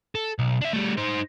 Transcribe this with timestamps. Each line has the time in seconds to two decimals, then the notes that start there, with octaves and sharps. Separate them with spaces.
0.15 A4
0.39 B1
0.61 D4 E5
0.73 G3 A3
0.97 D#4 C5